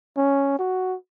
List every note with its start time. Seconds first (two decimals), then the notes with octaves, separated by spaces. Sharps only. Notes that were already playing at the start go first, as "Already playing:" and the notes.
0.17 C#4
0.59 F#4